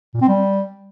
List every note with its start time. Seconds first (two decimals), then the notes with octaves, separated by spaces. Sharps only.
0.14 A#2
0.21 C4
0.29 G3